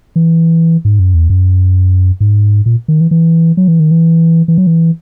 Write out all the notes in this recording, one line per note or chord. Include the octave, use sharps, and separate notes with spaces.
E3
G#2
F#2
E2
F#2
G#2
A#2
D#3
E3
E3
F#3
E3
D#3
E3
E3
F#3
E3